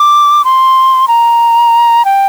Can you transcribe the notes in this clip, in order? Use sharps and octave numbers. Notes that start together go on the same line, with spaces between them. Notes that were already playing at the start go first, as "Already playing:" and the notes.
Already playing: D6
C6
A#5
G5